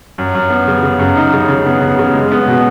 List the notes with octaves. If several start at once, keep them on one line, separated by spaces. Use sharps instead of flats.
F#2
F#2
B3
C#3
C#3
F#2
D#4
C#3
C#3
B3
C#3
C#3
G#3
B3
B2